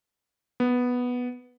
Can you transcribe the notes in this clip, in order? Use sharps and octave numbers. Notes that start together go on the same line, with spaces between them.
B3